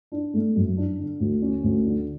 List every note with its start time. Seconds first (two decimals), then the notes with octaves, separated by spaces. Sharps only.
0.12 D4
0.34 A3
0.56 F#2
0.77 D4
0.99 D3
1.20 D2
1.42 C#4
1.63 D2
1.85 D3